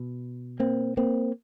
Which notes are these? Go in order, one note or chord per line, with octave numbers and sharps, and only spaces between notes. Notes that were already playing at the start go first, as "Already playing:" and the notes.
Already playing: B2
A#3 C4
A#3 C4